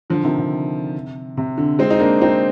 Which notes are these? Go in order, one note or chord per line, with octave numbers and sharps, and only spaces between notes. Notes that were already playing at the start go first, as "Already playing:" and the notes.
D3 F3
C3 D#3
C3
C3
D3
G#3 C4
D#4
A#3 D4
C4 D#4